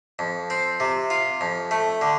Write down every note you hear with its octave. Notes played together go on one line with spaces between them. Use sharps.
F2
C4
C3
F4
F2
A3
D3